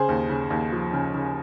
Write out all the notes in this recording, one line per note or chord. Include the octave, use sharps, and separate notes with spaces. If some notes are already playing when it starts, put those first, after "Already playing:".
Already playing: C#3 G#4 C5
D#2
C#3
D#2
F3
C#3
C#3